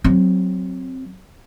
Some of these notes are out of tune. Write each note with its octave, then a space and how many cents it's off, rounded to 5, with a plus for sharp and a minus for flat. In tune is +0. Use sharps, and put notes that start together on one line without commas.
F#3 +0 C4 +0